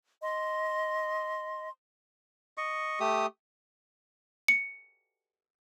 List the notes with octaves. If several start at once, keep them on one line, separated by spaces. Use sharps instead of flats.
D#5 C6
D#5 C#6
A3 G4 D#6
C#7